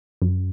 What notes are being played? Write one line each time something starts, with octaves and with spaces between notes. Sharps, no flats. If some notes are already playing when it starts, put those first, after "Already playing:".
F#2